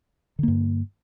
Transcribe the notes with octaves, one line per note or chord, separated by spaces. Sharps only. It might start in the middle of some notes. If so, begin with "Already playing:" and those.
G2 D3 A#3